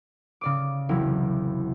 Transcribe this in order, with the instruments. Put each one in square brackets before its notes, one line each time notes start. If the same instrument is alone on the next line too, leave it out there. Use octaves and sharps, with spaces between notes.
[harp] C#3 D5 D6
E1 C2 F#3 E4